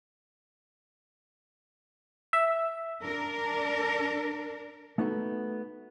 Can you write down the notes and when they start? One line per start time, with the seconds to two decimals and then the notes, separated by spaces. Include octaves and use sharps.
2.33 E5
3.03 D4 A#4
4.98 A3 B3 D#4 F#4 G#4 A4